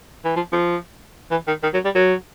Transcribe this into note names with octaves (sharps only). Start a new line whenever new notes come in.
E3
F3
F3
E3
D#3
D#3
F#3
G3
F#3